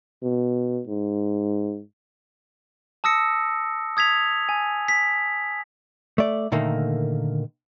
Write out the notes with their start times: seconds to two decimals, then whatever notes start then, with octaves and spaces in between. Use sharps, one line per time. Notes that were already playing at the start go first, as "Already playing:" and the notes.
0.22 B2
0.87 G#2
3.04 A5 D#6 E6 A#6 C#7
3.97 D#6 G#6 B6 F7
4.49 G#5
4.88 B6
6.18 A3 D5
6.52 A#2 D3 D#3 A3 A#3